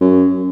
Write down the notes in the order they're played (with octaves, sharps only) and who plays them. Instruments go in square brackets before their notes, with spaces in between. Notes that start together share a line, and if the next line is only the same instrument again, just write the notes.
[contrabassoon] F#2